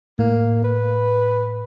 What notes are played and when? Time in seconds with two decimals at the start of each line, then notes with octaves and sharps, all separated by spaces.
0.19 A2 A#3
0.64 B4